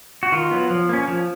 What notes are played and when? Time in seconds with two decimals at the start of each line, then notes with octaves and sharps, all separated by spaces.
0.23 F#4
0.32 D#3 F4
0.51 F#3 B3
0.70 F3
0.89 A#3 C#4
1.08 F3